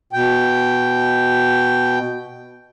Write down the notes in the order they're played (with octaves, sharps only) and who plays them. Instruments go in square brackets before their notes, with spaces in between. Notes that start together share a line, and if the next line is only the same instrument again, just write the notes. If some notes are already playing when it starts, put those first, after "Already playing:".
[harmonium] B2 G5